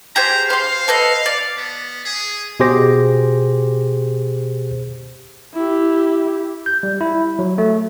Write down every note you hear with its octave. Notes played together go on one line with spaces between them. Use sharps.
G4 G#4 C5 A#5
C5 F5 C6
A4 B4 D#5
D5
B3
G#4
B2 G4 G#4 C5 D6 A#6
E4 G4
G6
G3
E4
F#3
A3